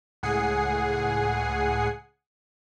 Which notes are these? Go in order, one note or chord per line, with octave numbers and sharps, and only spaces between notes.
C#2 A2 G#4 F#5 G#5 C7